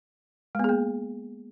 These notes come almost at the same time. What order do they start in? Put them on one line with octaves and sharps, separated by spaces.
G#3 B3 G#4 A#3